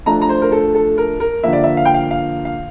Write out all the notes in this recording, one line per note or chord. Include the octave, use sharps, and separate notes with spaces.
F3 A3 D4 A#5
A#5
C5
A#4
A4
A4
A#4
A#4
D3 F3 A#3 E5
D5
E5
F5
G5
F5
F5
F5